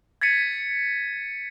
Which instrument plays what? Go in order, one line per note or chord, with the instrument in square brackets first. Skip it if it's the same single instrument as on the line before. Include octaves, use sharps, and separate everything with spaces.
[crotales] G#6 A6 B6 C#7 D#7